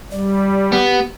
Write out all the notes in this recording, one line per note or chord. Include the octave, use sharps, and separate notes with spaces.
G3 D5
B3 G4